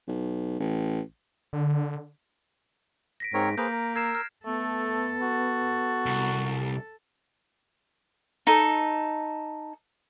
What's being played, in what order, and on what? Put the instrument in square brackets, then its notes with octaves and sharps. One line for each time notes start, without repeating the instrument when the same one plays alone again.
[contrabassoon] B1
A1
[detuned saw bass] D3
[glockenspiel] A#6 B6 D7
[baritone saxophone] G#2 [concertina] C4 A#4 C#5
[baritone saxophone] A#3 [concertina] G#4 B4 C5 [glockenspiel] G6
[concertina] A#4
[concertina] A#4 E6 [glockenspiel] G#6 C7 E7
[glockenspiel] F6
[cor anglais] A3 [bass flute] B3 [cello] A4
[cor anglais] F#4
[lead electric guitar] C2
[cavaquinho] D#4 A4